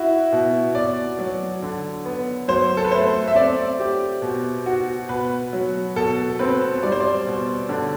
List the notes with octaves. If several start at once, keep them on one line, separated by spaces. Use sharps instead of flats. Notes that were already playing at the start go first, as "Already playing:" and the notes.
Already playing: E4 F#4
B2
B2 D5
F#3
D3
B3
F#3 C5
A4
B4
A3 C5
E5
C4 D5
G4
B2
F#4
B2 B4
F#3
B2 A4
C4 B4
G3 D5
C5
D5
B2
D3 D5